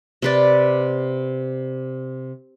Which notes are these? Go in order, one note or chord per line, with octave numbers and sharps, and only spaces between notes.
C3 B4 D5